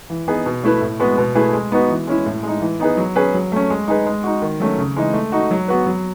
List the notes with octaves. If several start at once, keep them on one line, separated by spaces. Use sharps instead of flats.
E3
B3 D#4 G#4 B4
B2
A3 E4 B4
A2
G#3 B3 F#4 B4
B2
A3 E4 G#4 B4
G#3
B3 D#4 F#4 B4
E3
G#3 C#4 E4
A2
G#3 D#4
E3
B3 D#4 G#4 B4
F#3
C#4 G#4 B4
F#3
A3 C#4
G#3
D#4 G#4 B4
G#3
D#4 F#4
D#3
F#3 A3 C#4
C#3
E3 G#3 D#4
A3
D#4 F#4
F#3
B3 F#4 B4
F#3